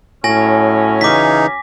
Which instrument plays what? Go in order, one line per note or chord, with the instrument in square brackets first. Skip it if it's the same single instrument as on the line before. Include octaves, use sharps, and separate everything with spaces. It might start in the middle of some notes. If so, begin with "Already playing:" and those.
[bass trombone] A2 [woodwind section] F#3 C#4 [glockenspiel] G#5 A#6
[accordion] C#3 E3 D#4 [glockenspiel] D6 B6